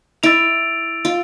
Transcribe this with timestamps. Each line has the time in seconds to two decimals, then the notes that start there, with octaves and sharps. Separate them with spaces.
0.23 E4 E6 A6 D7 F7
1.05 F4